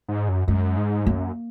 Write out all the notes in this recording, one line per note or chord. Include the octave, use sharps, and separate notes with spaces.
G#2
F#2
F#2 G#3
G#2
F#2 A#3